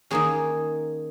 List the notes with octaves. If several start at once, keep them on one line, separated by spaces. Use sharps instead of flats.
D#3 A#3 C#4 G#4